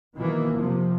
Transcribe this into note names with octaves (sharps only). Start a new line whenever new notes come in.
B2 D#3 E3 A#3
F1 C3 F3